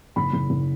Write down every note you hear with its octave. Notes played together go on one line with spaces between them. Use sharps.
F#1 B5
F#1
F#1